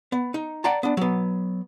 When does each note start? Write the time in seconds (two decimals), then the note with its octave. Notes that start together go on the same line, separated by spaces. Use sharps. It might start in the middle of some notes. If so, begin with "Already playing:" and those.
0.12 B3
0.34 D#4
0.64 D5 F#5 G5 A5 A#5
0.83 B3 D4
0.97 F#3 B3